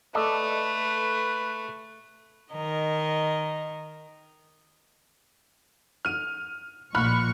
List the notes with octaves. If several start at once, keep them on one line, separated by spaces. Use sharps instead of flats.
A3 A4 B4 D5 D#5
D#3 A#4 D#5
F6 D#7
A#1 A#2 B5 C#6 F6 F#6